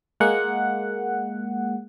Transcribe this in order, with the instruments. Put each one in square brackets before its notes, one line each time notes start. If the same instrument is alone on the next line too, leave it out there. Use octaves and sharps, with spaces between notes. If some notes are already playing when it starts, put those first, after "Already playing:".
[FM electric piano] G#3 A#3 F#5